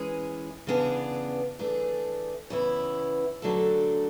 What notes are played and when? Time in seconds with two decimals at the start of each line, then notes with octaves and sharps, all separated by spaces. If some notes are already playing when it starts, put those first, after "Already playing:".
Already playing: E3 G#3 C#4 E4 G#4
0.67 C#3 E3 B3 D4 G#4
1.59 E3 A3 D4 G#4
2.50 C#3 E3 B3 E4
3.42 D3 F#3 A3 D4 A4